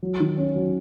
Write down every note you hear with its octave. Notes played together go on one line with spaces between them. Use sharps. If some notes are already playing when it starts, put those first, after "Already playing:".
F#3
D#3
C#4
F#3